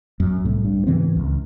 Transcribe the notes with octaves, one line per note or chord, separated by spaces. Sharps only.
F#2
C2 A2
G2
G#2 C#3 E3 C4
C#2